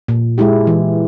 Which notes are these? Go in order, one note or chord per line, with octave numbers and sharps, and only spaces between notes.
A#2
G#3 E4 G4
E3